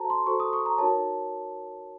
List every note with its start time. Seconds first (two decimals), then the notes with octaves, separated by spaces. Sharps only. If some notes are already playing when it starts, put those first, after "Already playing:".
Already playing: F#4 A4 C5 A5 A#5
0.10 C6
0.26 F#4 A4 C5 C#6
0.40 D#6
0.53 C#6
0.66 A#5
0.78 D#4 F#4 A#4 C#5 A5